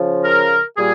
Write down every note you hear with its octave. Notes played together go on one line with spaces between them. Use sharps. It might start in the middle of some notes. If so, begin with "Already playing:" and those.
Already playing: C#3 F3
A#4
A#2 G3 G#4